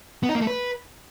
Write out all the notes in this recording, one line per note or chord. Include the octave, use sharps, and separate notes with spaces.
B3
D#4
A#3
A3
B4